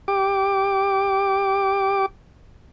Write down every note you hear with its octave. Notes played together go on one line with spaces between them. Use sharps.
G4 D6